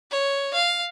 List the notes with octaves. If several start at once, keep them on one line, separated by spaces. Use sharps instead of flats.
C#5
F5